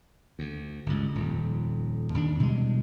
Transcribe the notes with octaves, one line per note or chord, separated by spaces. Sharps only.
D2
G1 C#2
D#1 F2
D#2 D#3 D4
B2 E3 G3 G#3